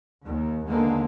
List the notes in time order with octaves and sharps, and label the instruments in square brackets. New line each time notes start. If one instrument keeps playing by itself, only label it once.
[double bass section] D#2
D#2 D3 G#3 A#3 B3